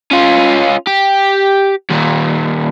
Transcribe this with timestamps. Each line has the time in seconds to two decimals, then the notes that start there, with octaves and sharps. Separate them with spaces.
0.11 C#4 F4
0.87 G4
1.90 D#2 A#2